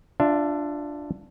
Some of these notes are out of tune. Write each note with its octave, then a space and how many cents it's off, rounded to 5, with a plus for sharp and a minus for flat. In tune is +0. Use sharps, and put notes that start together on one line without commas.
D4 +0 F4 +0 E5 +25